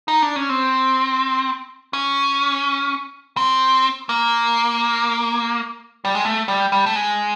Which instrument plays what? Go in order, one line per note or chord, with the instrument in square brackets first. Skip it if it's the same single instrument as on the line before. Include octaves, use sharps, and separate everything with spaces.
[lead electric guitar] D#4
D4
C#4
C4
C#4
C4
A#3
G3
G#3
A3
G3
G3
A3
G#3